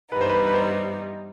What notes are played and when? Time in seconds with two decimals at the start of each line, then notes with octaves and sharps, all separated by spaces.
0.12 G2 E3 G3 B3 D#4 B4
0.21 C5
0.29 B4
0.47 B4
0.54 C5